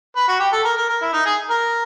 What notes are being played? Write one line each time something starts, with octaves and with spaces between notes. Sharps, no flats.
B4
F#4
G4
A4
A#4
A#4
A#4
E4
D#4
G#4
A#4